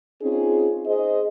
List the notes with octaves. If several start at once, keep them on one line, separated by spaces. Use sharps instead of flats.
C4 C#4 D#4 F4 G#4
G#4 C5 D#5